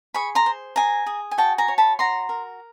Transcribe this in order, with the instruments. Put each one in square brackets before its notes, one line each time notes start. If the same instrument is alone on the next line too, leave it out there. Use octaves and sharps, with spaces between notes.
[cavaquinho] G#4 B5 C#6
A#5 C6
C5
G#4 G#5 A#5
G#4
G#5
F#4 G5 A5
G#5 A#5
C#5
A5 B5
F#4 A#5 C6
A#4